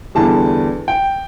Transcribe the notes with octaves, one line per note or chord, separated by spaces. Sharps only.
E2 D3 G3 A5
G5